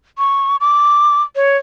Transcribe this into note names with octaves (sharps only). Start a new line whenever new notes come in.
C#6
D6
C#5